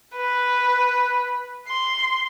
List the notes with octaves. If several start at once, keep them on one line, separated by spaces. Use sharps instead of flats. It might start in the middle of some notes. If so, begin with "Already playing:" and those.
B4
C6